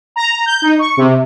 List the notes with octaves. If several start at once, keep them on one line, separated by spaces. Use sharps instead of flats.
A#5
G6
D#4
C#6
C3